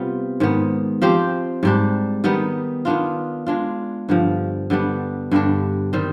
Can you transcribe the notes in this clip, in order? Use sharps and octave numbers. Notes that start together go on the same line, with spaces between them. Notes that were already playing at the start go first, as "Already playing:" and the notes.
Already playing: C3 G3 B3 F4
G#2 D#3 B3
F3 C4 G4 C5
G#2 G3 D4
D#3 G3 B3 D#4
D#3 B3 D4 F4
G#3 D4 F4
G2 D3 F3
D3 G3 B3 D4
G2 D3 G3 D4
D#3 G3 C4